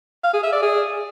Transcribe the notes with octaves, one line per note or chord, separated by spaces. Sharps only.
F5
G#4
E5
D5
G#4